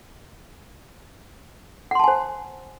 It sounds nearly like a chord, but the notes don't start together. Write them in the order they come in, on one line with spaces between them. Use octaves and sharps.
F#5 C6 A5 G#5 C5